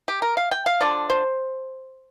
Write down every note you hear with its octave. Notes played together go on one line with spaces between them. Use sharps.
G4
A#4
F5
G5
F5
D3 F3 D4 D5
C5